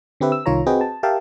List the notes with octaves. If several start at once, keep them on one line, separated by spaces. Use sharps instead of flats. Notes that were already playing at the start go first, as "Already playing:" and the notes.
D3 C4 G4 B4 E5
E6
C2 D#3 F4 C#5 A#5
C4 F#4 G#4 B4 D#5 G5
A5
G4 A#4 E5 F5 G5 A5